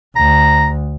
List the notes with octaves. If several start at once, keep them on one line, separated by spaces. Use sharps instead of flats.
D2 A#5